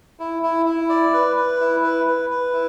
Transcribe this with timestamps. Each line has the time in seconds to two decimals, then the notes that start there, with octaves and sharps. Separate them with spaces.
0.20 E4
0.43 E4
0.66 E4
0.89 D5
1.13 B4
1.36 B4
1.60 E4
1.83 B4
2.06 B4
2.30 B4
2.53 E4